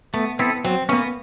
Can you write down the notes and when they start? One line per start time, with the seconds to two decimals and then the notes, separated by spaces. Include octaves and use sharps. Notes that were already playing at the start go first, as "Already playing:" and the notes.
0.14 A3 B3
0.39 B3 C4 E4 A4
0.64 F#3 C4
0.89 A#3 B3 C#4